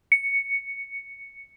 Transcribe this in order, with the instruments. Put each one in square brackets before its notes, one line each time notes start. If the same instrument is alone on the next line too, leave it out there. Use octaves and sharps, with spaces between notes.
[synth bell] C#7